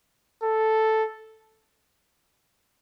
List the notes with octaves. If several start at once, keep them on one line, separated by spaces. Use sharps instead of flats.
A4